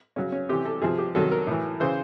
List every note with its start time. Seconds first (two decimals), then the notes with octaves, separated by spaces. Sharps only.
0.16 C#3 F#3 C#4
0.32 C#4
0.49 C3 E3 G4
0.65 A4
0.82 C3 F3 G#4
0.99 G4
1.15 C3 D#3 F#3 A4
1.31 A#4
1.47 A2 E3
1.80 C#3 E3 C5